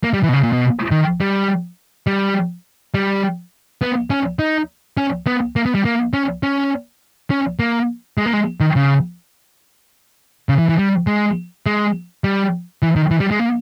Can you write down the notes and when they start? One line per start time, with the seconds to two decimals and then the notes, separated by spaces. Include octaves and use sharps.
0.04 A#3
0.14 G3
0.23 E3
0.29 B2
0.33 C#3
0.43 A#2
0.52 B2
0.91 D#3
1.21 G3
2.07 G3
2.94 G3
3.82 B3
4.10 C#4
4.39 D#4
4.97 C#4
5.27 B3
5.56 A#3
5.66 B3
5.75 G3
5.85 A#3
6.13 C#4
6.43 C#4
7.31 C#4
7.59 A#3
8.18 G#3
8.26 A#3
8.33 G#3
8.60 D#3
8.76 C#3
10.49 C#3
10.59 E3
10.69 E3
10.79 G3
11.07 G#3
11.66 G#3
12.24 G3
12.82 E3
12.96 D#3
13.11 E3
13.20 G3
13.31 G#3
13.39 A#3